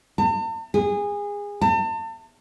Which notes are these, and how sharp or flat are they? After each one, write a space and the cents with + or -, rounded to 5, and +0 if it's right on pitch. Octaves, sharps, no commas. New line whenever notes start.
A5 +45
G#4 -25
A5 +35